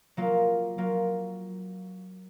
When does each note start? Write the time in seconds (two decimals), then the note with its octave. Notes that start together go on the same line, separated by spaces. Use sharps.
0.17 F#3 A#3 F4
0.78 F#3 A#3 F4